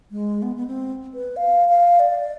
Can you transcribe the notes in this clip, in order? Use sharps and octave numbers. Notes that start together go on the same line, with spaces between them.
G#3
B3
B3
C4
B4
F5
F5
D5